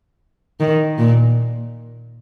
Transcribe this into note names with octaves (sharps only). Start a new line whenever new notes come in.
D#3
A#2